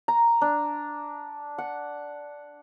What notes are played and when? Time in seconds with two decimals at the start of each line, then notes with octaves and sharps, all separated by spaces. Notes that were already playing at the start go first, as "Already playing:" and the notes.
0.08 A#5
0.42 D4
1.58 F#5